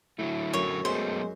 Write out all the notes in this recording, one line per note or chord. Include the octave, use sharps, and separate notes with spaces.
D3 F#3 A3 E4
F#2 C#5
F#3 G#3 A3 B3 C5